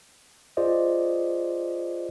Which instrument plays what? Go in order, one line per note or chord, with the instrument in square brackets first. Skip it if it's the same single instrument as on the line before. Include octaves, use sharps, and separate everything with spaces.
[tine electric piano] F4 G#4 C5 D5 D#5